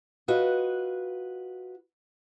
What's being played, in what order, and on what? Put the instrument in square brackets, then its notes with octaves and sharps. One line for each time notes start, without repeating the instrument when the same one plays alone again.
[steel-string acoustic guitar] F4 F#4 B4 D#5